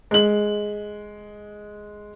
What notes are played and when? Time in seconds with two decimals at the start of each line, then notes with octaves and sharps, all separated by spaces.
0.11 G#3 F#7